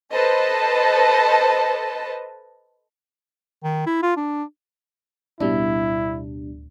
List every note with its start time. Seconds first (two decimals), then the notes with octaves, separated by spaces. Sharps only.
0.13 A4 B4 C5 D#5 A5
3.63 D#3
3.86 E4
4.02 F4
4.17 D4
5.40 D1 B2 G3 D4 E4